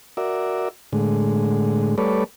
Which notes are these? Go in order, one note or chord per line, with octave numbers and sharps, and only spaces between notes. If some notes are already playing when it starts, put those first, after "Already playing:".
F#4 A#4 D5 E5
A2 D3 G#3
G3 A3 A4 B4 C#5 D5